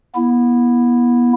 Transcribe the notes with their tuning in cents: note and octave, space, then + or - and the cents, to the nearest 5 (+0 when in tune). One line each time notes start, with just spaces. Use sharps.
B3 -30 E4 +0